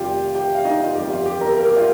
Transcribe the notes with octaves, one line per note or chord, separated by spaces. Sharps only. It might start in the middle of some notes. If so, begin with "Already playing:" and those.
Already playing: F1 F2 D#3 G3 F4 G4 F5 G5
G4 G5
F5
D#4 D#5
F4
G1 F2 F3 G4
F4
G4
A#4 A#5
A#3 A#4
G4
F4